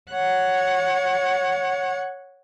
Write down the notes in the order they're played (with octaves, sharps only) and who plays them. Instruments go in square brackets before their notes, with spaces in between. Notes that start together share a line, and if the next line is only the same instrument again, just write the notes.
[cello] C#5 F#5